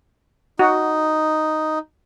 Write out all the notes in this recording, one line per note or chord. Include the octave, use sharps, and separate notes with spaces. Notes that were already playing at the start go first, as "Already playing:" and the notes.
D#4 F#4